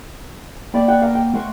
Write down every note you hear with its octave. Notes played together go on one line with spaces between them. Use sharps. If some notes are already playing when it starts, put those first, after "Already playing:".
A#3 D5 G5 B5
F#5 G5 C#6
F5 G5 A#5
G5
A3 F#5 C6 C#6